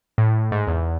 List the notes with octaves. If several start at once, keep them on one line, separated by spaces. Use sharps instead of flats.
A2
G#2
E2